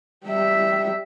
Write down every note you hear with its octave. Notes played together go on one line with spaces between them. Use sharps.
G3 E5